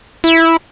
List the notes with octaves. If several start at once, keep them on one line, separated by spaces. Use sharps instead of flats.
E4